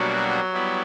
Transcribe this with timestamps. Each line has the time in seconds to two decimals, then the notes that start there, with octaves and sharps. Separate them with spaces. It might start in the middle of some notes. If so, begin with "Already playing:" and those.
Already playing: B2 F#3 G3 A#3 D4 F#4
0.53 G3 B3 E4